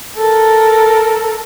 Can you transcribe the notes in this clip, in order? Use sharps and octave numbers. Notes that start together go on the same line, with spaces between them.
A4 A#4